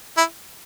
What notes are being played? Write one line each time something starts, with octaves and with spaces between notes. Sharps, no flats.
E4